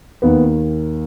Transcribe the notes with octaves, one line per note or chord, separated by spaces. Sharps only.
D#2 D#3 B3